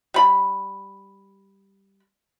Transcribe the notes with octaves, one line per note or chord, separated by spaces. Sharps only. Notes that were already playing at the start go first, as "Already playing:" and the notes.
G3 B5